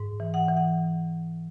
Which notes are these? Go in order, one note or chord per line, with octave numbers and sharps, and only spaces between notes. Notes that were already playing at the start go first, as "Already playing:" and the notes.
Already playing: G#2
E3
F#5
E3
F#5